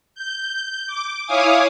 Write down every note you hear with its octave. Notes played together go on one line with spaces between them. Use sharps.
G6
D6
E4 C#5 F5 G#5 D6 D#6